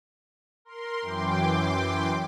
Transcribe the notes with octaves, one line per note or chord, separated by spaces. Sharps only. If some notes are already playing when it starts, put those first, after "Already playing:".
A#4 C6
F#2 E3 G5 C6 D6